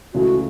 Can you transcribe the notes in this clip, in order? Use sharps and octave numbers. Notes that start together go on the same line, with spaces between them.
C#2 C#3 E3 A3 E4 F#4